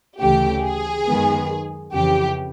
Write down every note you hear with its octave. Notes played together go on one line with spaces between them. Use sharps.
D2 C#3 E3 A3 G4
G#4
F#2 D#3 G#3 B3
F2 C#3 E3 G4